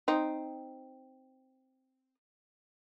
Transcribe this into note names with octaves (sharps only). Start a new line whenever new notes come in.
C4 D#4